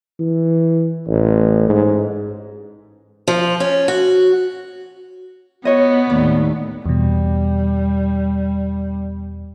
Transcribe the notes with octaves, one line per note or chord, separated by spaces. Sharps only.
E3
A1
G#2
F3
C#4
F#4
B3 F#4 C#5 D#5
D#2 A2 D5
E2 B2 G3